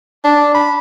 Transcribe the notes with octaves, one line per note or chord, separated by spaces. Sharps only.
D4
B5